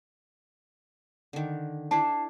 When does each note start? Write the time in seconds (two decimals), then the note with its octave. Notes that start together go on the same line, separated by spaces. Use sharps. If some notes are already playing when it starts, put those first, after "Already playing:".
1.33 D3 D#3
1.91 D4 E4 A5 C7